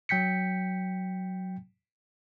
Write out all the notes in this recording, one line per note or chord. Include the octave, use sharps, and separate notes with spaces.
F#3 G5 G6 B6 C#7